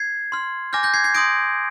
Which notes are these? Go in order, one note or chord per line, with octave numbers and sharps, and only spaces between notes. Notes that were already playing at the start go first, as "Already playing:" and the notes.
Already playing: G#6 C7
C6 F6
G#5 D6 F6 G6 A#6
G6 A#6
G#6 C7
G#6 C7
C6 D#6 G6 A#6 D7